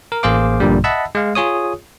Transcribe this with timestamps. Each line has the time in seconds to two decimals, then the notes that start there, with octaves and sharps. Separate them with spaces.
0.12 A#4
0.23 A1 A#3 G#4 C5 F5 D6
0.60 A#1 G2 A#2 D3 G3
0.84 D#5 E5 F#5 A5 B5 E6
1.15 G#3 F5
1.35 F4 G#4 C#5 D#6